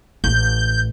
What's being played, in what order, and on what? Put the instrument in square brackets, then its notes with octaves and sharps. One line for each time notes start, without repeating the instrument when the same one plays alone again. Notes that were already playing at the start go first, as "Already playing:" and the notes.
[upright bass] A1 [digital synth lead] G6